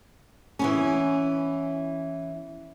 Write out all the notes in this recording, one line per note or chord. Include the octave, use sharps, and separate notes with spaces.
E3 B3 C#4